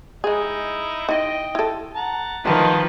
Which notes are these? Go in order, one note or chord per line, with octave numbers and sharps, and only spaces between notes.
G#3 D#4 E4 G#4
D#4 E4 D#5 G5
E4 A4
F#5 A5 A#5
D#3 F3 A3 A#3 D#4 F#4 B4 A5